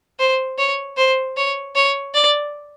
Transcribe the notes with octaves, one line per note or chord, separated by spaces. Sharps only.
C5
C#5
C5
C#5
C#5
D5